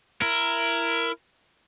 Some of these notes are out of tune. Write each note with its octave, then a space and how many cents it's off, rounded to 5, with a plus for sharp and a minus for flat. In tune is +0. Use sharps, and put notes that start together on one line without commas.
E4 +20 A#4 +0